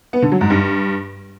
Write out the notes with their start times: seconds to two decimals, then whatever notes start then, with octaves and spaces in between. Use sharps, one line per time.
0.13 B3
0.22 D3
0.32 F#3
0.41 G#2
0.50 G2